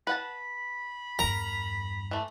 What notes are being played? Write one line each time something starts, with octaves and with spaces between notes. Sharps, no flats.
B4 F#5 A5 B5
E2 G2 A#4 A#5
E3 A3